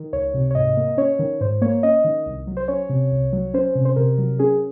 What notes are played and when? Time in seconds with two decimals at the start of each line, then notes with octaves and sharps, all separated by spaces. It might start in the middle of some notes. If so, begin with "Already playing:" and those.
Already playing: D#3
0.13 C#2 C#5
0.34 C3
0.51 C#5
0.55 G#2 D#5
0.77 A#3
0.98 C#4 C#5
1.19 D#3
1.41 G#2 C5
1.62 A#3 C#5
1.83 C#4 D#5
2.04 D#3
2.26 C2
2.47 F#3
2.57 C5
2.68 C#4 C#5
2.89 C3
3.12 C2
3.33 F#3
3.54 C#4 C5
3.75 C3
3.85 C5
3.96 C3 A#4
4.18 F#3
4.39 C#4 G#4